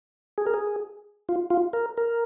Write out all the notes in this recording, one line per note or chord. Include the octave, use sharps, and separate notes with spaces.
G#4
A#4
G#4
F4
F4
A#4
A#4